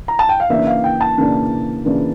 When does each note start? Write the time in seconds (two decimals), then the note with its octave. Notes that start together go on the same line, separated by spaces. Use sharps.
0.08 A#5
0.19 A5
0.29 G5
0.40 F5
0.49 C#3 E3 A#3 D4 E5
0.67 F5
0.84 G5
1.01 A5
1.17 C#3 E3 A#3 D4
1.85 C#3 E3 A#3 D4